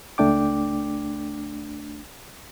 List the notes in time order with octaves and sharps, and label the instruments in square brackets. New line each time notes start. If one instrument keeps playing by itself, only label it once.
[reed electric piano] C#2 A3 D4 G5 D6